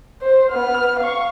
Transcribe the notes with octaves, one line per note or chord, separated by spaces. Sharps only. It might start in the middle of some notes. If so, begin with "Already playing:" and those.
C5
B3 F6
F5 C#6